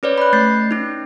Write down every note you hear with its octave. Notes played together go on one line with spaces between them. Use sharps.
C#4 B4 C#5 D5
B5 F#6
A3 G6 A6 C7
C#4 D#4